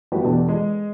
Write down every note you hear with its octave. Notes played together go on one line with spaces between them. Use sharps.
G3 A3 B3 E4 F#4 G4
E2 B2 D4 A4
G#3